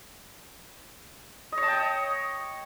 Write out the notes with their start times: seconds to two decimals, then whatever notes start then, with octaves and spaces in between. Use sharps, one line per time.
1.52 D#5
1.58 C#5
1.63 A5
1.68 G5
1.73 D#5